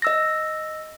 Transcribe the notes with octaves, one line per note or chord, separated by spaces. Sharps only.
D#5 E6 A#6